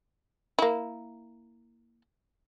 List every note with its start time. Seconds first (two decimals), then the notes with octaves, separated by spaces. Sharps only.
0.59 A#3 E4